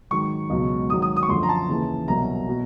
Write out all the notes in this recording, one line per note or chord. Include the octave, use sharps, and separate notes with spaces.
G#2 D#3 F#3 C#6
C#2 B2 F#3
G#2 D#3 F#3 D#6
D#6
D#6
C#6
F#2 D3 F3 C6
A#5
A5
D#2 C#3 E3
C2 B2 F#3 A#5
B2